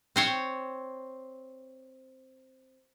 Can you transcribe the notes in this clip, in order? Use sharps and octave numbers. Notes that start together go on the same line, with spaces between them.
C4 C5 C#5